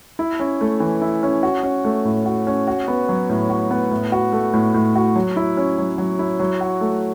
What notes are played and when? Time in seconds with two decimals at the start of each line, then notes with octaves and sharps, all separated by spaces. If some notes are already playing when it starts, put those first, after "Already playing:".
0.19 E4
0.40 C#4
0.61 A3
0.80 E3
1.02 E4
1.23 C#4
1.43 F#4
1.63 C#4
1.84 A3
2.05 A2
2.26 F#4
2.47 C#4
2.67 F#4
2.88 B3
3.09 F#3
3.30 A2
3.50 F#4
3.71 B3
3.91 A2
4.12 F#4
4.32 A3
4.54 A2
4.74 A2
4.96 F#4
5.16 F#3
5.36 E4
5.57 C#4
5.78 F#3
5.98 F#3
6.19 E4
6.40 F#3
6.61 F#4
6.81 A3